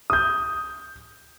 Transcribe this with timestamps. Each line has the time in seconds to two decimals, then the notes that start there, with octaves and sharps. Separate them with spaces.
0.10 D#6 G6